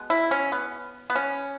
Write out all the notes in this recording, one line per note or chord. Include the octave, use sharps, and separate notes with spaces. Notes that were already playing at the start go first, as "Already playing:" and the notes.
Already playing: B2 G#3 B3
E4
C#4
B3
B3
C#4